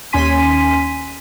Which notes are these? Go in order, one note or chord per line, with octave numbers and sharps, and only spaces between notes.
D#2 C#4 G#5 C6 B6 D#7